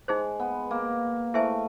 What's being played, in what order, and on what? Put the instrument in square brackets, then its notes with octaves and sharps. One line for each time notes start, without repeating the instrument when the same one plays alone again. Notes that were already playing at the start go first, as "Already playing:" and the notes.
[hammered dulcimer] G#3 [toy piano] D#4 G#4 C5
[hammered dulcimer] B3
A#3
[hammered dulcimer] A3 [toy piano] E4 G#4 C5 E5 G#5